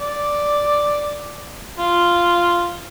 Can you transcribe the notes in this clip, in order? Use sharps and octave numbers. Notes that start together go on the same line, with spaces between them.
D5
F4